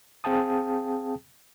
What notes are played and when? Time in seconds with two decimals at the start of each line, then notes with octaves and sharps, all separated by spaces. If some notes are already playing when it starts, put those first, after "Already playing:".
0.24 C4 G#4 F5 G5 A5 D#6